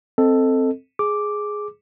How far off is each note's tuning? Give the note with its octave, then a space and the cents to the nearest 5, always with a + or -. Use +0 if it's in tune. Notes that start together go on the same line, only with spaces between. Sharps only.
C4 +0 A4 +5 D#5 +0
G#4 +5 D6 +0